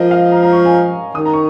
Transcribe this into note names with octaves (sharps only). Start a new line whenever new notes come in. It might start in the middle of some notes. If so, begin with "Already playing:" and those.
Already playing: F3 A#4 D#5
F5
A#5
A#5
C#6
G#5
A#5
D#3 D#6
A#5
C#6